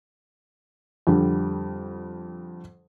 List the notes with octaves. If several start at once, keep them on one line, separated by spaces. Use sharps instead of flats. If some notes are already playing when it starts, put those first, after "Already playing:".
F2 D3 G3